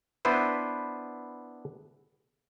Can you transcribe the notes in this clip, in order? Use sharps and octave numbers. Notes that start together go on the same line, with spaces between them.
B3 D4 E4 B4 C5 E5